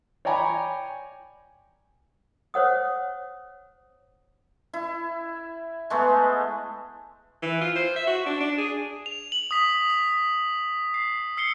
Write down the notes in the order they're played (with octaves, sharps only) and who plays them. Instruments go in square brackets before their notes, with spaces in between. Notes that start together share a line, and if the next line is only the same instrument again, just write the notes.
[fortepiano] C#5 D5 G5 G#5 A#5 B5
[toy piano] C5 C#5 F#5 D#6
[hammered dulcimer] E4
G#3 A3 B3
[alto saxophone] E3
F4
C5
E5
F#4
D4
D4
G#4
[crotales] F7
F#7
D#6 B6
B6
C7
E6 C7 C#7 G7